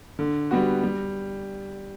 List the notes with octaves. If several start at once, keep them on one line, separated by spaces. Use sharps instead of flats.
D3
G3 B3 F#4
G3